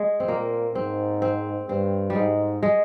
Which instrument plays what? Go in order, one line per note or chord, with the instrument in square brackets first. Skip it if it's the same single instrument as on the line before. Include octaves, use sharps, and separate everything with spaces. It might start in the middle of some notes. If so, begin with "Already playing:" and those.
Already playing: [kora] G#3
C4
[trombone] A#2 [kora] A#3
[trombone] G#2 [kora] C4
[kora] C4
[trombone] G2 [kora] C4
[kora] G3
[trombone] G#2 [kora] G#3
[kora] G#3